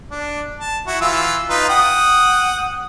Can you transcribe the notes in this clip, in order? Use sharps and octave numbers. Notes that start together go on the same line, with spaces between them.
D4
A5
E4 F#4
E3 F4 E6
D#4 F4 B4
F#5 G5 D#6